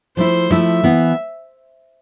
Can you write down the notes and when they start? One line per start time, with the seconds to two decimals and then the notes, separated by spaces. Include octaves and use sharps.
0.17 F3 A3 E4 C5
0.51 F3 A3 E4 E5
0.84 E3 B3 E4